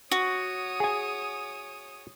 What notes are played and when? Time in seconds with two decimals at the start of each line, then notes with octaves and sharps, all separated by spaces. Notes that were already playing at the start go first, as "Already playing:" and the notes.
0.11 F#4 C#5 D#6
0.80 G#4 G#5